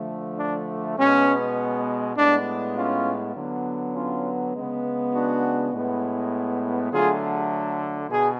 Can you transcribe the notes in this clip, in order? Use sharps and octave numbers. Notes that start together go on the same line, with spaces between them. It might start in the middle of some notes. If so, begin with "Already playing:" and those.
Already playing: D3 F3 A3
D4
B2 G#3 B3 C#4
A2 G#3 B3 D4
C#4 F4
D3 F#3 B3
C#4 F4
C#3 G#3 B3
D4 F#4
A2 G#3 B3
D3 F#3 A3 F4 G#4
B2 G#4